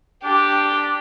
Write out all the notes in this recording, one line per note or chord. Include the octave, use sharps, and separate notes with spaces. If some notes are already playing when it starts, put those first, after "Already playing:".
D4 G4